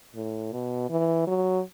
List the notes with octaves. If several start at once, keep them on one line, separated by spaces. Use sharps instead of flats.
A2
B2
E3
F#3